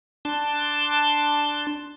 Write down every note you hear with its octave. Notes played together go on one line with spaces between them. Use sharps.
D4 A5 C6